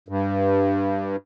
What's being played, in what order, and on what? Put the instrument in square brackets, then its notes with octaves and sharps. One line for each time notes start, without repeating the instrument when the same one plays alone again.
[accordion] G2